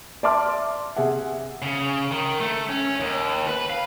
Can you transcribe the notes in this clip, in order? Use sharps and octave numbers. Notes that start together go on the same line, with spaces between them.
D5 E5 A5 C6 D6 F6
C3 G#4 E5 F#5
C#3
D#3
A3
C#4
D#2
B4
F5